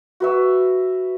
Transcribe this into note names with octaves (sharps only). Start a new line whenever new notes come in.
F#4 B4 E5